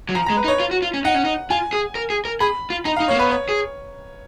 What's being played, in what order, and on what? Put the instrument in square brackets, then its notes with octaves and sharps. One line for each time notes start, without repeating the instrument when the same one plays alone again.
[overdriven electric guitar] F#3
[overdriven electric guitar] F3 [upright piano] A#5
[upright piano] A#5
[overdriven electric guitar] G#3
[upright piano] B4
[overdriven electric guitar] D#4
[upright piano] C#5
[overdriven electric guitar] F4
F#4
F4
C#4
[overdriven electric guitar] D#4 [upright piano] F#5
[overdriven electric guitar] C#4
D#4
[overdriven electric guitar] F4 [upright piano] G#5
[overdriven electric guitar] G#4
A#4
G#4
A#4
[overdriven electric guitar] G#4 [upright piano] B5
[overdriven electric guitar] F4
[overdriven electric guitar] D#4 [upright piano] A#5
[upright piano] F5
[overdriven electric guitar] D#4
[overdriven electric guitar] A#3 [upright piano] C#5
[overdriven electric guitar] B3 [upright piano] B4
[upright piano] C#5
[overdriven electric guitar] G#4